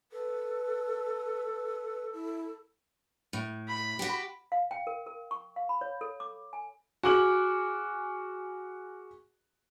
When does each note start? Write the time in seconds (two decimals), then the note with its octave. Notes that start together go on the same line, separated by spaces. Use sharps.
0.12 A4 B4
2.13 E4
3.33 A2
3.68 B5
3.99 F#4 G4
4.52 F5
4.71 G5
4.87 A#4
5.07 A#4
5.31 C#6
5.56 F5
5.69 B5
5.81 C#5
6.01 A4
6.20 D6
6.53 G#5
7.03 F#4 G#4 G#5 D6 F6 F#7